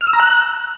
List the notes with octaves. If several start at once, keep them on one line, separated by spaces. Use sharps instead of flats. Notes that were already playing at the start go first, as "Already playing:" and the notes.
F6
E6
A#5
F#6